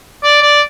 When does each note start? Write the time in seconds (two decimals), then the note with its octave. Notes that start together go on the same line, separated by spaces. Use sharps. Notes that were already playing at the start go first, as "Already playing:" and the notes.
0.24 D5
0.42 D5